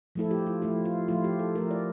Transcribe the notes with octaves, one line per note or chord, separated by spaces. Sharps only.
F3 A3 E4 A4
G4
F4
F3 A3 E4
F4
F3 A3 E4 F4
G4
A4
F3 A3 E4 A#4
D5